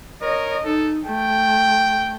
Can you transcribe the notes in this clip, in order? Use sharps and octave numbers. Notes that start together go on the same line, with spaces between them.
A#4 C#5 D#5
D#4 A4
A3 G5